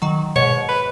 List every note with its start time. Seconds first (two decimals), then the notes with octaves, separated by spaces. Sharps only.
0.02 D#3 F#3
0.36 G#2 B2 C#5
0.68 B4